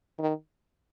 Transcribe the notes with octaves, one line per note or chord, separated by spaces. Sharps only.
D#3